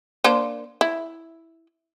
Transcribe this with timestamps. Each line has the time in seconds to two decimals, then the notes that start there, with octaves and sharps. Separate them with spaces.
0.24 A#3 D4 C5
0.81 E4